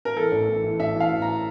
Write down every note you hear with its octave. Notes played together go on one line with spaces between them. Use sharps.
A#4
E3 A4
A1
E3
E3
A1 E5
E3 F5
A1
A#5